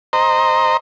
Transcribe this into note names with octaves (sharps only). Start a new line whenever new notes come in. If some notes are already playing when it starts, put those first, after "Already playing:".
C5 D#5 A#5